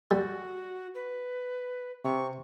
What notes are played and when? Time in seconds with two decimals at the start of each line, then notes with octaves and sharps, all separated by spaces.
0.11 G3 F#4
0.95 B4
2.04 C3 C#6